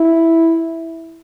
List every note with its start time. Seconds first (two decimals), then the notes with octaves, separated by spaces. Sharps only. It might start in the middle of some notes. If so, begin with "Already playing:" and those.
Already playing: E4